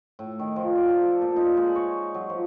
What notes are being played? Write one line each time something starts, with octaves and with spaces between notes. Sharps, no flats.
A2
D#3
F3
D5
A5
A4
A#2
D#4
G#3
C#5
F#3
F3